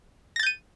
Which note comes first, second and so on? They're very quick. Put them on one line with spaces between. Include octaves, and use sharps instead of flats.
A#6 A6 G6 D#7